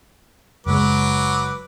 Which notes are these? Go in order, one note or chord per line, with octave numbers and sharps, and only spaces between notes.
F#1 F#3 G#3 B4 D6